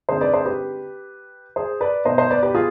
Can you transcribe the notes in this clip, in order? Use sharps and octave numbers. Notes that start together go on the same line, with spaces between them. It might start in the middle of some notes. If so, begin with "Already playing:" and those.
D3 G#3 C4 D#4 G#4 C5
B4 D5
G#4 C5
G4 B4
G#4 C5
B4 D5
B2 B3 D#4 C5 D#5
C5 D#5
B4 D5
G4 B4
F4 G#4